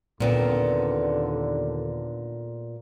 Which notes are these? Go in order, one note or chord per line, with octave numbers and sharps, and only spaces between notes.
D#2 A#2 D3 B3 C4